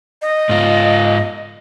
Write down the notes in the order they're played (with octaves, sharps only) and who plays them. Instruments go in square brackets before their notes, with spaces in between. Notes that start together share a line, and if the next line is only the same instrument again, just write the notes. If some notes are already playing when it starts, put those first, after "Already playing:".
[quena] D#5
[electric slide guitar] G#2 F4